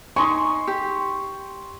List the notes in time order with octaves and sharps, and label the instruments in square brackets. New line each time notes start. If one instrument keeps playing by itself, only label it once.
[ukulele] D#4 G#5 [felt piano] C6 C#6
[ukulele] G4